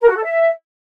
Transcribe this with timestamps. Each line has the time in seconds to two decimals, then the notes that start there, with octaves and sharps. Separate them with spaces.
0.01 A#4
0.08 F#4
0.16 A4
0.23 E5